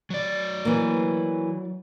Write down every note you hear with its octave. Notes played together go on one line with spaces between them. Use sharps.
F#3 D5
E3 A#3